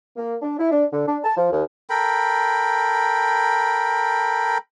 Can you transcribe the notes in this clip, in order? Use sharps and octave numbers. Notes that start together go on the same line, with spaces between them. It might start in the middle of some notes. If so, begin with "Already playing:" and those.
A#3
D4
E4
D4
D3
D4
A5
F3
D#2
A4 A#4 G5 B5